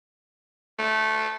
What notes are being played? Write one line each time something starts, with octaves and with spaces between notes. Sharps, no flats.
A3